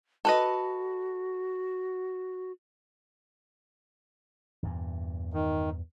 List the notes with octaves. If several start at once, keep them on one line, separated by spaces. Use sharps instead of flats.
F#4 A4 B4 D#5
E2 G2 A#2
D#3